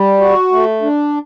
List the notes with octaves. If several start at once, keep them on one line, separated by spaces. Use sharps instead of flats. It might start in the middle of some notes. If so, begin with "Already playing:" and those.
Already playing: G3
F#4
A3
D4